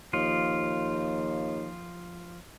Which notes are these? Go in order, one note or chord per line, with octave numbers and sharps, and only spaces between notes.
D#2 F3 F4